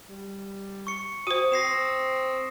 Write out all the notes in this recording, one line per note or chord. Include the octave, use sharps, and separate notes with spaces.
G3
C#6 C#7
F#4 C5 D#6
C4 A#6 C7 E7